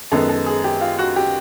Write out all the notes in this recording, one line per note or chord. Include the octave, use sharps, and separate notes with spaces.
F#2 D#3 G#3 B3 A4
A4
G#4
G4
F4
F#4
G4